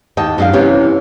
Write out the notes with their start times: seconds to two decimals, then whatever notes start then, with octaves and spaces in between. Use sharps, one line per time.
0.17 D#2 D#5 G5 A5
0.38 F#2 D4 F5
0.53 C3 E3 C#4 G4